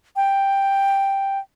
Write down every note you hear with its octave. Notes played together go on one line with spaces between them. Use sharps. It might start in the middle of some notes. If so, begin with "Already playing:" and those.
G5